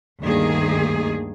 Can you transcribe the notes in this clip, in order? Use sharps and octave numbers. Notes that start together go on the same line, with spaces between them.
D2 G2 D#3 A#3 G#4